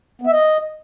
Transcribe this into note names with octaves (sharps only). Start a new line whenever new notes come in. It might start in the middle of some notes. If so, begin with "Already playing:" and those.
B3
E5
D#5